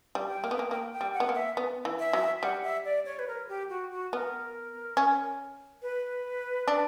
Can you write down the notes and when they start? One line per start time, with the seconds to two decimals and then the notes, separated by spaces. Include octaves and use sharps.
0.15 G3
0.29 G5
0.44 A#3
0.51 B3
0.59 A#3
0.71 A#3 G5
0.93 G5
1.01 G3
1.14 F#5
1.20 B3
1.29 A#3
1.35 E5
1.57 B3
1.85 E3
1.99 E5
2.13 F#3
2.42 G3 F#5
2.64 E5
2.85 D5
3.06 C#5
3.19 B4
3.28 A#4
3.49 G4
3.70 F#4
3.92 F#4
4.13 B3 A#4
4.97 C#4
5.82 B4
6.68 D4